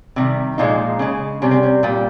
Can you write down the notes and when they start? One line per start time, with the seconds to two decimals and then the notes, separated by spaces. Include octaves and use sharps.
0.16 C3 D#3 G3
0.58 A#2 F3 G#3 D#4
0.99 C#3 G#3
1.42 C3 G3 C#4
1.51 C4
1.63 C#4
1.83 A#2 G3